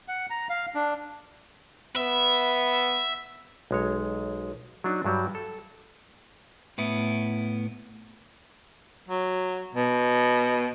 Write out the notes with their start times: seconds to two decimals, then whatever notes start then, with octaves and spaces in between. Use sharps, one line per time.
0.08 F#5
0.30 A#5
0.50 F5
0.75 D4
1.96 B3 E5
3.71 B1 G#3 C#5
4.84 F#3 D4 D#4
5.05 G2 F#3 G3
5.35 A4
6.78 A2 B3 E4
9.09 F#3
9.75 B2